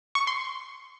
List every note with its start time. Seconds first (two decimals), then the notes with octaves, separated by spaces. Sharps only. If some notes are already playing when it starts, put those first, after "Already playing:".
0.15 C#6
0.27 C6